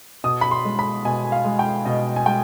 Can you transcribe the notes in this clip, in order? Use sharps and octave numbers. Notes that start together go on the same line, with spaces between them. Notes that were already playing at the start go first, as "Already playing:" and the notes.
B2 D#6
B5
C6
G#3
B5
B2 G#5
F5
G#3
G5
B2 D#5
G#5
G#3 G5